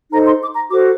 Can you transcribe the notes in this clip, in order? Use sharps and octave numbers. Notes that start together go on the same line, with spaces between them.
D#4 A4 C5 A#5
C6
D6
A#5
F#4 A4 C5 D6